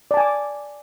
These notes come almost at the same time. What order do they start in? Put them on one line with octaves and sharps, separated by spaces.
D5 A5 G#5 D6